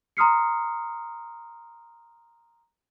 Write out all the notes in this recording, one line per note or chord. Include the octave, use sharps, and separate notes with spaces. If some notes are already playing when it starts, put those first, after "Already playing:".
A#5 C6 D#6 F6 C7 C#7